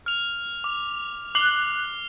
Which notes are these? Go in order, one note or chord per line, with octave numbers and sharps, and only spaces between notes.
F6 F7
D6
D6 F#6 C7 G7